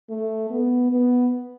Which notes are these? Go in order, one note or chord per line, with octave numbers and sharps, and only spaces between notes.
A3
B3
B3